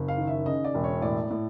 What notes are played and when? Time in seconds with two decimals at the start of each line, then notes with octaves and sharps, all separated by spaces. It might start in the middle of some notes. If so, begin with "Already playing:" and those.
Already playing: F#1
0.08 F5
0.18 D#3
0.27 E5
0.46 C#3 D#5
0.64 D5
0.75 E1
0.84 C#5
1.02 A2 D5
1.31 A2